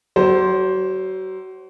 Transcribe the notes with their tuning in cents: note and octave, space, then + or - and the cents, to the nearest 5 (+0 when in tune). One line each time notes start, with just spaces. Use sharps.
F#3 +35 C5 +0